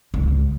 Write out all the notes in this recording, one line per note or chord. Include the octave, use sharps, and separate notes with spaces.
C#2